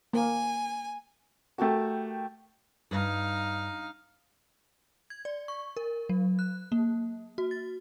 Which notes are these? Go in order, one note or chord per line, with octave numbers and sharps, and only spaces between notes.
A#3 G#5
A3 F#4 G4 A#4 A5
G2 D#4 F5
G#6
D5
C#6
A#4
F#3
F#6
A#3
F#4
A6